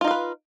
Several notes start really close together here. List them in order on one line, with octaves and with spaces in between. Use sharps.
F4 D#4 F5 B4